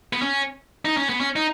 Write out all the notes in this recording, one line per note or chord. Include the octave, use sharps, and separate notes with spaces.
B3
C#4
D#4
C#4
B3
C#4
D#4